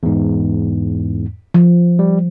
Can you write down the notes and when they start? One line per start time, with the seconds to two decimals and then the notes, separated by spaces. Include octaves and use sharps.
0.03 E2 G#2
1.54 F3
1.99 G3